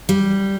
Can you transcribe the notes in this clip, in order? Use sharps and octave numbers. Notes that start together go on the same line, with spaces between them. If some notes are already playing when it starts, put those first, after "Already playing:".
G3